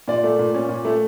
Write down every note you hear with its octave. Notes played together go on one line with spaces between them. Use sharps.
A#2 D5
A3
A#2
C#4
A#2
A3